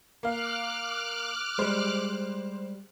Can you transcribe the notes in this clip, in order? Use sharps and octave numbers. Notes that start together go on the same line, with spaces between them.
A#3 F5 D6 F6 F#6
G3 G#3 C5